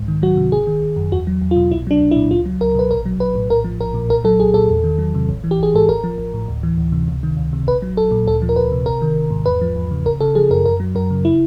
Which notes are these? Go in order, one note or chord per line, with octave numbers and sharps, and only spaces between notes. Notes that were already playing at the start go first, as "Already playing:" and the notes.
Already playing: C2 G#2
D#3
F#3 F#4
C3
G#1 G#4
D#3
G#1
F#2
E2 F#4
F#3
E2
F4
B2
C2 E4
F#3 D4
C2
E4
A#2
C#2 F4
F#3
C#2 A#4
B2 B4
A#1 A#4
F#3
A#1 B4
A2
A#1 A#4
F3
A#1 A#4
A#2
C2 A#4
F#3 A4
C2 G#4
A#2 A4
E2
D#3
F#3
C3
A1
E3
G4
A1 G#4
G#2 A4
A1 A#4
F3
A1
A2
D2
E3
D2
C3
C#2
D#3
C#2
C3
A#1 B4
F#3
A#1 A4
A#2
D2 A4
F3
A#4
D2 B4
C3
G#1 A#4
D#3
G#1
G#2
E2 B4
F3
E2
C#3
G#1 A#4
C#3 A4
F3 G#4
F#2 A#4
F#2 A#4
F#3
F#2 A#4
C#3
E4